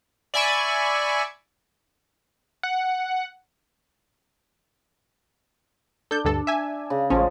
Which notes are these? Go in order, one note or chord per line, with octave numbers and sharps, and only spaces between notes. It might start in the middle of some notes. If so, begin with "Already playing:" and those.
D5 E5 G#5 B5 C#6
F#5
D4 A4 G6
D2 G2 A4
E5 G#5
C#3
A1 F3 G#3 C#4